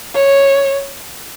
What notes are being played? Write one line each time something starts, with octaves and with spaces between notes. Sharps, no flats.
C#5